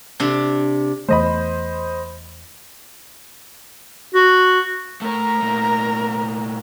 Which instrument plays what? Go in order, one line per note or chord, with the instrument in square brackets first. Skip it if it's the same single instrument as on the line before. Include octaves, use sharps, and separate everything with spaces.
[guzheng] C3 D4
[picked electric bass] E2 E3 A3 [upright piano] C5 D#5 B5
[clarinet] F#4
[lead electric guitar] A3 C#5 [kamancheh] A#4 A#5
[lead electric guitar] A#2 A3